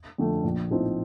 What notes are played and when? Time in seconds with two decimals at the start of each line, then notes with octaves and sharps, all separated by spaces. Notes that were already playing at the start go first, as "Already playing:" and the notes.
0.18 F2 D3 A3
0.44 A#1
0.70 A2 F3 C4 D#4